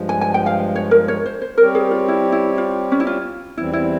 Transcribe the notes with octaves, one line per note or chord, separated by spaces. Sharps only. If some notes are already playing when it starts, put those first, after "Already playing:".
Already playing: G2 F3 G#3
G#5
G#5
G5
F5
C#5
A#4
C#5
C5
C5
G3 C4 G4 A#4 C#5
G#4
F4
E4
E4
F4
C#4
E4
F4
E2 E3 G3 C4 E4
E4